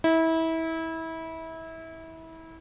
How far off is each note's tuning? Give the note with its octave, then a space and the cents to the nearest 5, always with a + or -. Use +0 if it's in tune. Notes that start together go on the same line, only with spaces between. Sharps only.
E4 -25